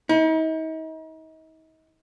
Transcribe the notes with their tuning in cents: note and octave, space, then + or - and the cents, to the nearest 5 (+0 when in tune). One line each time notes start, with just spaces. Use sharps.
D#4 +40